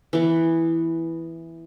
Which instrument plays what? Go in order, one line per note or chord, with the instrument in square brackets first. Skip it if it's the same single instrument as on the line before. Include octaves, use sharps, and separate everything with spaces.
[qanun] E3 B3